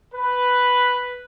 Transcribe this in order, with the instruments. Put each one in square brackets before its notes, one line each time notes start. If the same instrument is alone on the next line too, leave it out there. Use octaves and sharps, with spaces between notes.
[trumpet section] B4